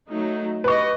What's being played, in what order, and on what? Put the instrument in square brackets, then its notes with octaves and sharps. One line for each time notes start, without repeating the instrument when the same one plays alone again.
[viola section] F#3 A3 D#4
[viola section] G4 D#5 [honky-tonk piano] B4 C#6